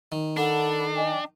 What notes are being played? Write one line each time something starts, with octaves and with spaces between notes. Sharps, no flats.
D#3
D4 A4 F#5 B5
D#5 G5 G#5